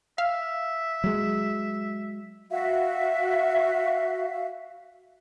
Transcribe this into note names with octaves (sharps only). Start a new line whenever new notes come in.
E5 F5
F#3 G#3
F#4 E5 F5